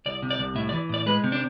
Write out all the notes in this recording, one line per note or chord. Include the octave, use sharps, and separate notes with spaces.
C2 D5
C3
D5
C2
A2 E5
D5
E3
A2 D5
G#3 B4
C3
D4